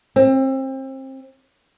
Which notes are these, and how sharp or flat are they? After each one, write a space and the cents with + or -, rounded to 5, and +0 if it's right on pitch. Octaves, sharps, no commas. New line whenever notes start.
C4 +30